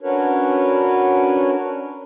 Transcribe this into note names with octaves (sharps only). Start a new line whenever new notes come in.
C#4 D4 F#4 A#4 B4 C#5